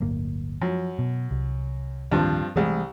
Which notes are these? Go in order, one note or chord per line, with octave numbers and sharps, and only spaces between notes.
D1 G1 A#3
F#2 F3
B2
C2
D1 G2 D#3 F3 C4 D4
C2 E3 G#3 A3 G#4